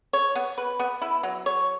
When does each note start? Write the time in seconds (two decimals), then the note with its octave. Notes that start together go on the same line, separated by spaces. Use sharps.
0.13 C#5
0.35 B3
0.58 B4
0.80 B3
1.02 E4
1.23 F#3
1.46 C#5